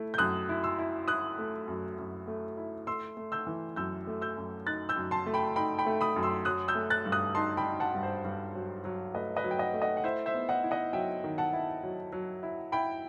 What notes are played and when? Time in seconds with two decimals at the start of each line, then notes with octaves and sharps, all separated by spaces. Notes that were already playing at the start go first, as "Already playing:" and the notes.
Already playing: A3 E4
0.14 G6
0.18 F#2 D#6 F#6
0.49 E4
0.63 C6 E6
0.78 E4
1.08 E4 D#6 F#6
1.39 A3
1.68 F#2
1.98 F#2
2.28 A3
2.57 E4
2.87 A3 C6 E6
3.17 A3
3.32 E6 G6
3.47 E3
3.76 F#2 E6 G6
4.07 A3
4.22 E6 G6
4.37 F#2
4.66 D#4 F#6 A6
4.89 E6 G6
4.96 F#2
5.11 A5 C6
5.26 A3
5.34 G5 B5
5.56 D#4 G5 B5
5.78 G5 B5
5.86 A3
6.01 B5 D#6
6.16 F#2
6.23 C6 E6
6.45 F#3 D#6 F#6
6.68 E6 G6
6.75 A3
6.90 F#6 A6
7.06 G2
7.12 D#6 F#6
7.35 D#4 A5 C6
7.57 G5 B5
7.65 D#4
7.80 F#5 A5
7.95 G2
8.03 C5
8.24 G2
8.55 F#3
8.85 F#3
9.14 A3 B4 D#5
9.37 B4 D#5
9.44 F#3
9.51 G5
9.59 D#5 F#5
9.74 A3
9.82 D#5 F#5
9.97 F#5
10.04 E4 C5 E5
10.26 C5 E5
10.34 B3
10.49 D#5 F#5
10.63 E4
10.71 D#5 F#5
10.93 F#3 E5 G5
11.24 D#3
11.38 F#5 A5
11.53 E4
11.83 F#3
12.13 F#3
12.43 E4
12.72 E4 G5 B5